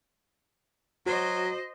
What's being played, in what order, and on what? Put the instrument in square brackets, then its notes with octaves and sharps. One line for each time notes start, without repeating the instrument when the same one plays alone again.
[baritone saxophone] F#3 [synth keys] F#4 [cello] C5 D#5